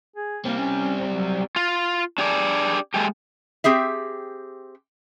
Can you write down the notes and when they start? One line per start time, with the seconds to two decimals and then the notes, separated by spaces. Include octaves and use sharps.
0.16 G#4
0.45 G3 A#3 C4
0.58 C#4
1.06 F#3
1.56 F4
2.18 D4 G4 G#4 D5
2.94 G#3 A3 G4
3.64 C4 G4 G#4 E5